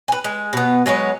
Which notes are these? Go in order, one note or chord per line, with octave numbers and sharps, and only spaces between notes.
B4 G#5
G#3
B2 B3
F#3 G#3 B3 C#5